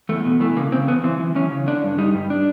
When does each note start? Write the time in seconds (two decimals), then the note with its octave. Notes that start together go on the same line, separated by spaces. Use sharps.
0.09 E2 A3
0.25 B2
0.40 E3 A3
0.56 C#3 A#3
0.72 C#3 C4
0.88 E2 B3
1.04 E3 C4
1.20 E3
1.35 E3 C#4
1.52 C#3
1.67 D3 D4
1.83 G2
1.98 G3 D#4
2.15 G2
2.30 D4